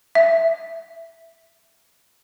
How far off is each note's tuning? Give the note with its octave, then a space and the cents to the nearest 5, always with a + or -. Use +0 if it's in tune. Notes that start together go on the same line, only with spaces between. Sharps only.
E5 +5